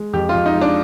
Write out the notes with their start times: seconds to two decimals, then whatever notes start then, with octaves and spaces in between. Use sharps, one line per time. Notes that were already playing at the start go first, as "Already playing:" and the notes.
Already playing: G#3
0.13 F2 G4
0.29 F4
0.34 F2
0.46 D#4
0.55 G#3
0.61 D4